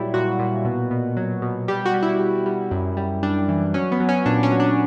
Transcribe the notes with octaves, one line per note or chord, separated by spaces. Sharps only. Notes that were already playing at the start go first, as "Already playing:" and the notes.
Already playing: A#2 F#3 G3 E4
A#2 F#4
A#2
B2
B2
F#3
B2
G3 G4
F#4
G3
E4
G3
G3
F#2
G3
G3 D4
E3
F#3 C#4
B3
F#3
C#4
A#2 D4
C#4
F#3
D4